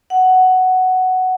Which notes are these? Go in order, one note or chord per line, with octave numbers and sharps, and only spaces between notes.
F#5